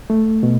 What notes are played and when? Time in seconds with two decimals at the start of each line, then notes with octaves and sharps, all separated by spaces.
0.10 A3
0.43 B2